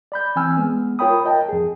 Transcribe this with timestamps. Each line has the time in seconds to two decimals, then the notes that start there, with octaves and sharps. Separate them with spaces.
0.12 D5 B5 G6
0.36 E3 C4 G#5 E6 F6
0.57 G#3 B3
0.99 F4 A#4 C#5 G5 B5 D#6
1.25 A#4 D#5 G5 A5
1.49 F2 G#4